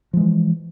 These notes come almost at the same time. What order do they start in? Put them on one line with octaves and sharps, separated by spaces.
F3 G#3 E3